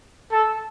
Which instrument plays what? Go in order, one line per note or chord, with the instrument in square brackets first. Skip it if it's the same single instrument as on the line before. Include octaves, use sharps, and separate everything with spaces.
[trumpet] A4